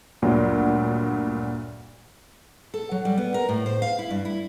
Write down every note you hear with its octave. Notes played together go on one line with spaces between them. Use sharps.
D2 G2 A#2 F#3
A4
F#3
G3
B3
A#4
A2
C5
F5
E4
G2
E4